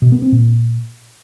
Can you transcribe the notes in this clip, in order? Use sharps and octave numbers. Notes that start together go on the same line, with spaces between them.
B2
B3
C4
A#2